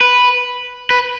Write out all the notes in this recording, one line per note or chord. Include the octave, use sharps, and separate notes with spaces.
B4
B4